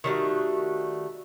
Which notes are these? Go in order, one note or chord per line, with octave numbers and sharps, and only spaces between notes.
D#3 G3 A3 F#4